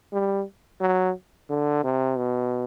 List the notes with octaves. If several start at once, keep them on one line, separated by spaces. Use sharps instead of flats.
G3
F#3
D3
C3
B2